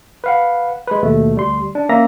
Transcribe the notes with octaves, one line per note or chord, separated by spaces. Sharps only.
B4 F5 F#5
G#3 B4
D#2 B2 A3
D2 G3 C6
D4
A#3 C#4 E5 A#5 A#6